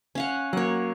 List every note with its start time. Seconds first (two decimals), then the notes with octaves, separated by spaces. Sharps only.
0.15 C#4 F5 F#5
0.53 F#3 A#3 C#5 F#5